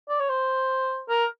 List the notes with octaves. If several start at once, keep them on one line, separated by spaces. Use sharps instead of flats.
D5
C#5
C5
A#4